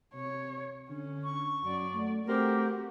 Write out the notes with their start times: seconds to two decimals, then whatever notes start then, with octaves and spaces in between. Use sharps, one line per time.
0.15 C3 C#5
0.90 D3 C#4
1.24 C#6
1.64 F#2 F#3 D5
1.95 A3
2.27 A3 C4 F#4 G4 A#4